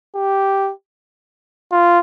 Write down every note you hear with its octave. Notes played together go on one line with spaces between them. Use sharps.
G4
F4